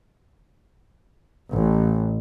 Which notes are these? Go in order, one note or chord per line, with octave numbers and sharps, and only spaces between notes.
A1